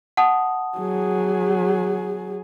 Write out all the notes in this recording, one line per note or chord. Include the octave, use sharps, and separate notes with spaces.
F#5 A5 D#6
F#3 G#4